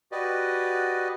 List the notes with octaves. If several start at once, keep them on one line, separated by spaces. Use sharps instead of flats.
F#4 G4 B4 D5 D#5